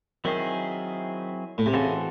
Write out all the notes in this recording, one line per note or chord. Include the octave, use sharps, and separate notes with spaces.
D#3 F#3 C4 E4 G#4
A2
C3
C#3 E3 C4 F#4 A4